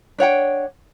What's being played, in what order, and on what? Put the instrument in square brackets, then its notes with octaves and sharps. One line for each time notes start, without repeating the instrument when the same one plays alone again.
[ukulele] D4 C#5 F#5 G5